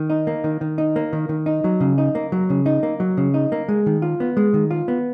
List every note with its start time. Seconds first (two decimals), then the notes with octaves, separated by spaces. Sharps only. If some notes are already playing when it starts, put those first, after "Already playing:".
Already playing: D#3
0.10 D#4
0.27 A#3
0.44 D#3
0.61 D#3
0.78 D#4
0.96 A#3
1.13 D#3
1.29 D#3
1.46 D#4
1.64 F#3
1.80 C#3
1.98 D#4
2.15 A#3
2.32 F#3
2.50 C#3
2.66 D#4
2.83 A#3
3.00 F#3
3.17 C#3
3.34 D#4
3.52 A#3
3.69 G#3
3.86 D#3
4.02 F4
4.20 B3
4.37 G#3
4.54 D#3
4.71 F4
4.88 B3